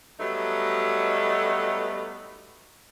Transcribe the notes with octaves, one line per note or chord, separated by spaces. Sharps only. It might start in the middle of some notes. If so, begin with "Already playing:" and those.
F#3 G3 A3 B3 D#4